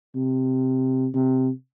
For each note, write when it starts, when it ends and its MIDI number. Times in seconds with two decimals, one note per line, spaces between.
0.16 1.07 48
1.15 1.50 48